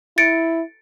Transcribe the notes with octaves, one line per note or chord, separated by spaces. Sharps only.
E4 A6 C#7 D7